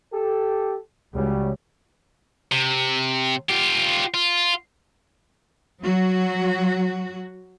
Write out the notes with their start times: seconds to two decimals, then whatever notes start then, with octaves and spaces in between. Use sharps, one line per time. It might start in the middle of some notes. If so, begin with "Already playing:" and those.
0.13 G4 A4
1.15 C#2 C#3 F#3 G3
2.52 C3
3.49 F4 G4
4.14 F4
5.83 F#3 F#4